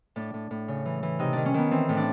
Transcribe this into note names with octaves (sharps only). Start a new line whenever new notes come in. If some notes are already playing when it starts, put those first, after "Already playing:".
A2 D4
A2
A2
C#3
E3
E3
C3 D#4
D#3 D4
C#4
D#3 B3
E3 C4
A2
D4